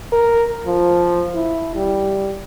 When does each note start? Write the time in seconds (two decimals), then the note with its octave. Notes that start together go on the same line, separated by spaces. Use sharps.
0.12 A#4
0.66 F3
1.35 E4
1.75 G3